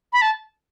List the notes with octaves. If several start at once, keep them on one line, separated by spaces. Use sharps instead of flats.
B5
A5